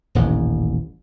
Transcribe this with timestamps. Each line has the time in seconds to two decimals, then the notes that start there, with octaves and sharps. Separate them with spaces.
0.15 D#1 A1 G2